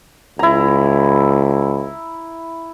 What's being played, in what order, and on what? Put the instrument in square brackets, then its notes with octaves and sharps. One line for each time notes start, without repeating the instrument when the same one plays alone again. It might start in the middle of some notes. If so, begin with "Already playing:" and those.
[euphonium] C#2 [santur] E4 A#5